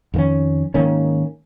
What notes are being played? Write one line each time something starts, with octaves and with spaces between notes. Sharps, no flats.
F2 D#3 A#3 C#4
G#2 D#3 A#3 C#4